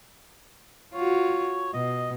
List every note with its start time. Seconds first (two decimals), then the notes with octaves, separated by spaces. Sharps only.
0.94 F4 F#4 C#5
1.74 B2 D#5